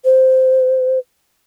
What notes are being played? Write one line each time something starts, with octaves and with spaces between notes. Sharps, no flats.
C5